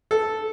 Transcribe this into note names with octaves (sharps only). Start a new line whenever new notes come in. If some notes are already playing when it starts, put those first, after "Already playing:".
A4